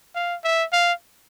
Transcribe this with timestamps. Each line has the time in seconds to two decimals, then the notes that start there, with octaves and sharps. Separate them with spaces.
0.15 F5
0.44 E5
0.73 F5